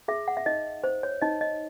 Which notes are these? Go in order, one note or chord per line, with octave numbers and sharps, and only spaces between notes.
G#4 E5
F#5
E5
D#4 D#5
C5
C#5
D#4 D#5
D#5